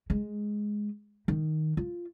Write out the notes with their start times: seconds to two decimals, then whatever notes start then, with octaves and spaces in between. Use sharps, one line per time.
0.10 G#3
1.28 D#3
1.77 F4